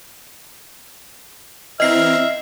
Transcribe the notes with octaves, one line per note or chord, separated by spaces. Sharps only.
E3 C4 D#5 E5 A#5 F6 C7